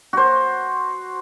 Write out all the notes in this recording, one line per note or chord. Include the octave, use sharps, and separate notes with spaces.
F#4 C5